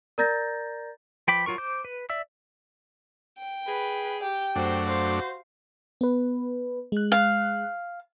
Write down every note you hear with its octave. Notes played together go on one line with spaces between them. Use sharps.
A#4 D5 A#5 G6 A6 A#6
F3 B4 G5 B5 D6
F#3 F4 A#4 C#6
C5 D6 G6
B4
D5 E5 E6
G5
G#4 B4
G4 G5
F#2 A3 D4 F#4 C5
C5 F5
B3 B4
G#3 F#6
F5